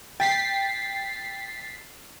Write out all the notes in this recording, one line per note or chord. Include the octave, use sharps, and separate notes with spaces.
G5 A6 B6 C7